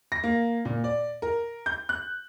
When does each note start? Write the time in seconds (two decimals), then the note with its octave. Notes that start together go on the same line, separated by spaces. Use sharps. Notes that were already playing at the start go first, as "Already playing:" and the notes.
0.12 A#6
0.24 A#3
0.65 A#2
0.84 D5
1.22 A#4
1.66 G6
1.89 F#6